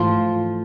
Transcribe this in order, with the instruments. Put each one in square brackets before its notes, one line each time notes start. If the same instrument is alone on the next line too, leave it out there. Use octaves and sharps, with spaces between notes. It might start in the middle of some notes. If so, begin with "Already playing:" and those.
Already playing: [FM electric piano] G#2 E3 A3 [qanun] F3 F4